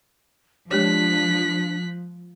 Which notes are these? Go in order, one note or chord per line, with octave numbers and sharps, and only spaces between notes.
F3 G#3 D4 G4 C#5 F#6 B6